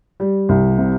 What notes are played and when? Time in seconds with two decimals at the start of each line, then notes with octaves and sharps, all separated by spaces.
0.20 G3
0.49 C2
0.78 C3